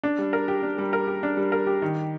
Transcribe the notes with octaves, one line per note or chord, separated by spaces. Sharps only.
D4
G3
A#4
G4
D4
G3
A#4
G4
D4
G3
A#4
G4
D#3